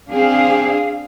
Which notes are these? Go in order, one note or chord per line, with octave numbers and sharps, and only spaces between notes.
C4 D4 G#4 F5